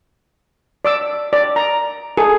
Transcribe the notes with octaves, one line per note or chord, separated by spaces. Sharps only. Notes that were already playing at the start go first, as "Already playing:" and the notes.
D5 D6 E6
D5
A#5
G#4 A4